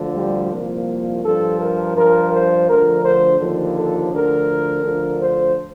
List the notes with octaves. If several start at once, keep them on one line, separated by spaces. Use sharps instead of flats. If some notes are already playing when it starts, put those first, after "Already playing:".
Already playing: D2 D3 F3
G3
C2 A#2 F3 A#3
G2 F3 A4
A#4
G2 F3 A#4
C5
D2 D3 F3 A#4
C5
D#2 D3 F3
A4
D2 D3 F3 A#4
D2 D3 F3
C5